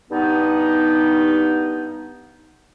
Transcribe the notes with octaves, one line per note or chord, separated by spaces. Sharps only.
G2 B3 D#4